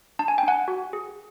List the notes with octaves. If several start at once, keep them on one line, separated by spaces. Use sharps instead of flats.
D4 A5
G#5
G5
D4 F#5 G#5
F#4
G#4